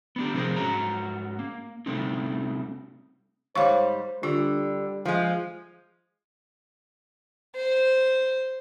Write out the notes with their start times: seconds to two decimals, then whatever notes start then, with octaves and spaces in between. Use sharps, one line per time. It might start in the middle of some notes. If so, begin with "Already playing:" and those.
0.16 B3 D4 G4
0.34 C3 F3 C4 G#4 A#4 C5
0.56 G#2 C#4 F#4 C#5 A#5
1.39 A#3
1.86 C3 G3 A3 C4 C#4 D#4
3.55 G#2 G3 C5 C#5 F5 C#6
4.23 D3 G3 F4
5.05 F3 G#3
7.56 C5